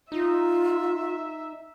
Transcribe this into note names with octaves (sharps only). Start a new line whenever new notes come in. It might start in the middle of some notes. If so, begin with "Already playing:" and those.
D#4 F4 E5